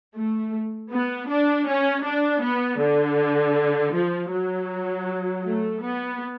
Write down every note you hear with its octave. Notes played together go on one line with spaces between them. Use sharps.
A3
B3
D4
C#4
D4
B3
D3
F3
F#3
A3
B3